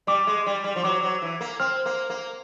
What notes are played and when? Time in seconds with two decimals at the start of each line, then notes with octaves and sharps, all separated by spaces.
0.07 G3 D6
0.27 G#3
0.46 G3
0.64 G3
0.76 F3
0.83 F#3 D6
1.03 F#3
1.22 E3
1.41 A#3
1.60 C4 F6
1.86 A#3
2.10 A#3